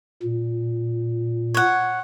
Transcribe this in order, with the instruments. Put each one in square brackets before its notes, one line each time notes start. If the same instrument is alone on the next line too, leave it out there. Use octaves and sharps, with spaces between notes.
[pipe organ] A#2
[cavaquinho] C#5 F#5